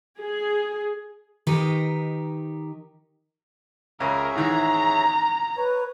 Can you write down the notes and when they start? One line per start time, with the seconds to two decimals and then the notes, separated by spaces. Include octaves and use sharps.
0.21 G#4
1.47 D#3 D#4 G4 A#4 B4
4.00 C#2 G#4 A#4 C#5 E5
4.36 G#2 D#3 E3 A#5
5.57 B4 C#5